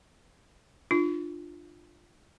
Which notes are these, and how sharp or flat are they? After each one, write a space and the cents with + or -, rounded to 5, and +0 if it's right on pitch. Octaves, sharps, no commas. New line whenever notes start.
D4 +30 F4 +0